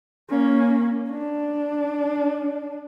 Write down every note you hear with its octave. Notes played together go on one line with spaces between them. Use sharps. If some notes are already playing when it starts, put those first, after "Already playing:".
A#3 C#4
D4